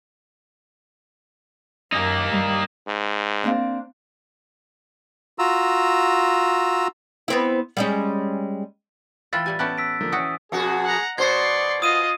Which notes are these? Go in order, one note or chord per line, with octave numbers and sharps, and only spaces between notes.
F#2 A#3 D#4
G2 G3
G#2
A#3 C4 D4
F4 F#4 A#5 E6
B3 C4 E4
G3 G#3 C#4
E3 F4 B4 G5 E6 A6
A2 G3 G4 G#5
B3 C#4 E4 G4 A5 F#6
E6 B6 D7
D3 F3 A#3
E3 C#4 F#4 G5 D#6
F2 B2 F#4 G#4
F#5 A#5
B2 C5 D5 C6 C#6 G#6 C7
F4 D#5 D#6 D#7